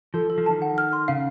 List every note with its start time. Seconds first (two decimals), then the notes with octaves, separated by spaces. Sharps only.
0.14 F3 A4
0.30 A4
0.38 F3
0.46 D#3 A5
0.62 F#5
0.78 F6
0.93 C6
1.08 C#3 F5